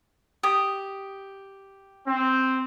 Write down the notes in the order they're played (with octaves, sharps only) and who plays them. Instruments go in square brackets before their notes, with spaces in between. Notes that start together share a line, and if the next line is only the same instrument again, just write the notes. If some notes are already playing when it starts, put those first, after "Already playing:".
[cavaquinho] G4 D#6
[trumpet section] C4